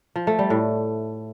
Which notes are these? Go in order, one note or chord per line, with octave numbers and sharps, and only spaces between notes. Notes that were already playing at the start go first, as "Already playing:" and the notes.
F3
A3
G3
A2